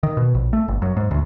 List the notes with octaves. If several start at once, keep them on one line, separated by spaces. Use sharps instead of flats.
D#3
B2
A#1
A3
G1
F#2
G#2
D2